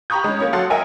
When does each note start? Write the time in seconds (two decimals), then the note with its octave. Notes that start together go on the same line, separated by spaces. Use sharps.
0.10 G4 A#5 B5 C#6 D#6 G6
0.24 G#3 C#4
0.39 A#3 C#4 C#5
0.53 F#3 A4 F5 F#5 C6 A6
0.70 A#4 D#5 E5 G5 G#5